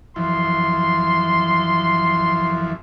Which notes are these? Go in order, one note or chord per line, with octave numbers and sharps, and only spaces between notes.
F#2 E3 F3 C6